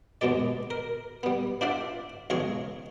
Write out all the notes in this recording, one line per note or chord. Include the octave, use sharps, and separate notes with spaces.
D#2 G#2 B2 G#3 D5
A#4
G3 B3
D4 F4 C5 D5 E5 F#5
B1 E2 C#3 G#3 G#4 C#6